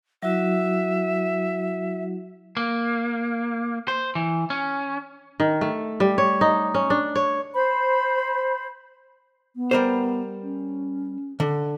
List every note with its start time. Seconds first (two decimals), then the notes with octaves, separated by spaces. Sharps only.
0.23 F#3 E4 F#4 E5
2.57 A#3
3.88 C5
4.15 E3
4.50 C#4
5.40 D#3
5.61 A3
6.00 G3
6.18 C#5
6.41 D#4
6.74 C#4
6.90 D4
7.15 C#5
7.54 C5 B5
9.56 B3
9.71 G3 A#4 C5
10.43 C#4
11.40 D3